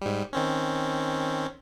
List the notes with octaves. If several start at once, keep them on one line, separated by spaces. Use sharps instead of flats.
G#2 G3
D#3 C4 C#4